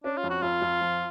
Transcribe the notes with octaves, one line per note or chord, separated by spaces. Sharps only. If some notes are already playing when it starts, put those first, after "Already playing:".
C#4 D4
F4
F2
F#4
F2 F4
F2
F3